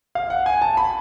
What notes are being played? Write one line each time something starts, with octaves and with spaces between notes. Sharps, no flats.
F5
F#5
G#5
A5
B5